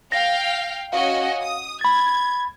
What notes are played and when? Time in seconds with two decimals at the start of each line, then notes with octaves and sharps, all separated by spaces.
0.12 F5 G5 A#6
0.93 C#4 F#4 D#5 F5
1.41 D#6
1.81 B5 G#6 A6